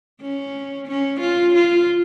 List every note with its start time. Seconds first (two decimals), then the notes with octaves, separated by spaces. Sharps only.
0.21 C#4
0.88 C#4
1.21 F4
1.54 F4